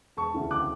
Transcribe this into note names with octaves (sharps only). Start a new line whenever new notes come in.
E1 A5 C#6
D2 C#3 E3
D6 F#6